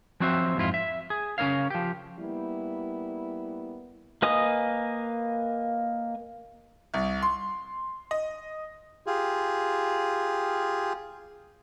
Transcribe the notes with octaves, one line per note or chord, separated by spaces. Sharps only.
F3 F#3 C4 F#4 C5 E5
F2 G#2 E4 F4
E5
G#4
C#3 C#4 A#4 C#5 F5
F3 G4
G3 A#3 B3 E4
A#3 B4 D#5 G#5 D#6
C2
C6
D#5
F4 G4 G#4